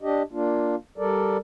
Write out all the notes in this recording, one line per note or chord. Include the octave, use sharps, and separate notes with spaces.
D4 G4 D#5
A#3 D4 F4
G3 A4 A#4 D5